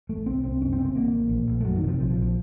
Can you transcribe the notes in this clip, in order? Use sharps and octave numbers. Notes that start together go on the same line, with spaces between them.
A1 A3
C2 C4
C2 C4
F#1 C#4
C4
C#3
C4
A1 A#3
A1
A#1
A#1
A3
F#1 F#3
D#3
C3
F3
D#3
A#1 F3
F3
A#1
F3